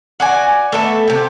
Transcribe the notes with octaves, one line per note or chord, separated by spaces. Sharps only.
F#4 D5 G#5
A3 B3 A4 E5
C3 G4